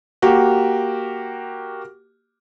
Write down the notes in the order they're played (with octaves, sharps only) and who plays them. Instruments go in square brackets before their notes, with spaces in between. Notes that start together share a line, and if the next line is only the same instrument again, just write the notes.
[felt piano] A#3 F#4 G4